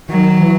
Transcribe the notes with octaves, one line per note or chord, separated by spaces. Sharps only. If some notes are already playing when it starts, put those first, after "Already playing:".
D#3 F#3
E3